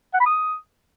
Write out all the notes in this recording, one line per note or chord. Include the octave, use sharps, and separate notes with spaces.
F#5
B5
D#6